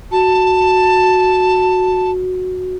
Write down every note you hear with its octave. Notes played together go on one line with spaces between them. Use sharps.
F#4 A5